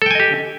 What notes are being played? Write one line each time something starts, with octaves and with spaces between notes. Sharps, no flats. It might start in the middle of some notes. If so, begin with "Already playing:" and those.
G4 A4 D#5 G5 G#5